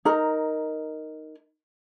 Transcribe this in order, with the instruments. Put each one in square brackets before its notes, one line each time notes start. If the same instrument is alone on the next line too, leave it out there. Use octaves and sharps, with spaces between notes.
[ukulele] D#4 A#4